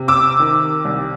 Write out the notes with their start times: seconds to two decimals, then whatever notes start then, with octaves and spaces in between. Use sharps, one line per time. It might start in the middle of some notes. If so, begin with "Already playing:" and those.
Already playing: C3
0.08 D6 E6
0.39 D#3
0.85 C2